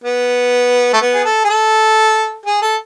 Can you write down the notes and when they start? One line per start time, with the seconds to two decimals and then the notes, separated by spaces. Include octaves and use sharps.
0.04 B3
0.93 A3
1.02 B3
1.14 G#4
1.25 A4
1.44 G#4
1.50 A4
2.46 G#4
2.62 A4